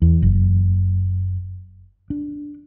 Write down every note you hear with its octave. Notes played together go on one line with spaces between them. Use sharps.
E2
F#1
D4